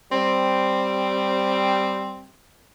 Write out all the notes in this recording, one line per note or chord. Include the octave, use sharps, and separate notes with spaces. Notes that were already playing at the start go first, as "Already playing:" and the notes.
G3 C4